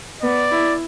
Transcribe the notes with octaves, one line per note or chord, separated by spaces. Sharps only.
B3 D5
E4